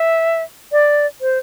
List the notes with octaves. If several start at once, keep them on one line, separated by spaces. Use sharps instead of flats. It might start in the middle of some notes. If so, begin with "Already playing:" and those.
Already playing: E5
D5
C5